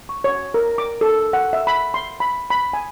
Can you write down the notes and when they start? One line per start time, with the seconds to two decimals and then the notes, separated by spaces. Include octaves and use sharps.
0.09 C#6
0.24 C#5
0.54 A#4
0.78 D6
1.01 A4
1.33 F#5
1.53 E5
1.67 B5
1.94 C6
2.20 B5
2.50 B5
2.73 G#5